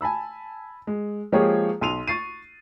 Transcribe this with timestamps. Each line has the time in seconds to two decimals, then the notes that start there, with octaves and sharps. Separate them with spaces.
0.01 G#5 A5 B5 E6
0.87 G#3
1.32 F3 G#3 A#3 G4 G#4 C#5
1.81 B1 C6 D#7 F7
2.07 C#6 A6 C7 D#7